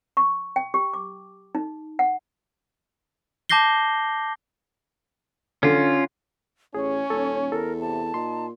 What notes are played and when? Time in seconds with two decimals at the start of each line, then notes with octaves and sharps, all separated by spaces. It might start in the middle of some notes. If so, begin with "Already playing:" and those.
0.17 C#6
0.56 G5
0.74 G4
0.93 D6
1.55 D#4
1.99 F#5
3.49 A5 D6 G6 A#6 C7 G7
5.63 D3 C#4 F4
6.74 A1 C#4 G#4 C#5
7.10 D#1 A4
7.52 E2 A4 A#4
7.80 C3 A5
8.14 A#2 D#4 C6